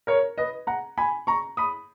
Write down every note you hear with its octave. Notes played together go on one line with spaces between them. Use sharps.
A#4 C#5
B4 D#5
F#5 A#5
G#5 B5
A#5 C#6
B5 D#6